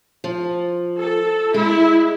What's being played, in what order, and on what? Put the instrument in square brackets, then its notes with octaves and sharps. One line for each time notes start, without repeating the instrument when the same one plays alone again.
[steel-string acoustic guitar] F3
[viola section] A4
[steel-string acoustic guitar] G#3 [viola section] E4